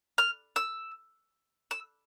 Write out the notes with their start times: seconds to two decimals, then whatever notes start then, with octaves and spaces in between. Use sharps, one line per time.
0.18 F6
0.56 E6
1.71 E6